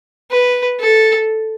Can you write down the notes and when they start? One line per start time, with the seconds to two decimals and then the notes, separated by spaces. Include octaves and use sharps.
0.31 B4
0.80 A4